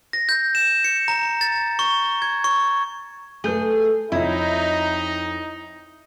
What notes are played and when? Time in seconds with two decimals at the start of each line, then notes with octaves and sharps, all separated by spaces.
0.13 A#6
0.29 G6
0.55 E7
0.84 C#7
1.08 A#5
1.41 A6
1.79 C#6
2.22 G#6
2.44 C#6
3.44 A3 G#4 A4 B4 G6 G7
4.12 F2 D#4 E4 C#5 D#5